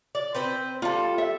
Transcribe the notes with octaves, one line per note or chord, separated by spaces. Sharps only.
D5
C4 B4 C5
G3 F4 A4
E5